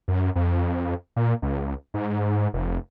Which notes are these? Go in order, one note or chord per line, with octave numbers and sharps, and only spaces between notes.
F#2
F2
A#2
C#2
G#2
F1